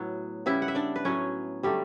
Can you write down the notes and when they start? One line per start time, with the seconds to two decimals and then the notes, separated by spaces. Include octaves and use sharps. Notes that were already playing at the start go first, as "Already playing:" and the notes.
Already playing: A2 F#3 B3
0.46 C#3 G3 B3 E4 E5
0.62 F#5
0.68 E5
0.75 D4 D5
0.96 B4
1.05 A2 F#3 B3 C#4 C#5
1.63 D3 F#3 G3 A3 G4